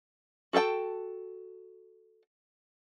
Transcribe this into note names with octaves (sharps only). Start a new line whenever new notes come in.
F#4 A4 A#4 G5 A5